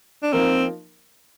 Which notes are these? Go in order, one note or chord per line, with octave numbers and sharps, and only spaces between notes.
D4
F3 A#3 C4 D#4 A#4